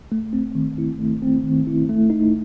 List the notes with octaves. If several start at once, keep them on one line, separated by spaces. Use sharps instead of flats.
A3
C4
D#3
E4
A3
C4
D#3
E4
A3
D#4